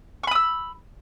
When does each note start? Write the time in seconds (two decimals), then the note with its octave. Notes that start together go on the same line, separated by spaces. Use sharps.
0.23 C#6
0.27 B5
0.31 D#6
0.35 E6